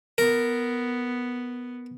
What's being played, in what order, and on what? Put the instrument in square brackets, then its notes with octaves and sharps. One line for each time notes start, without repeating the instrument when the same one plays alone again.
[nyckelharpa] B3 [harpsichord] A#4